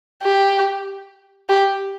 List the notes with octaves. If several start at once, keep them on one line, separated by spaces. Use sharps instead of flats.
G4
G4